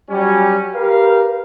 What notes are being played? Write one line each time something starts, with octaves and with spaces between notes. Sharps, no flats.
F#3 G3 C#4
G4 A#4 B4 F5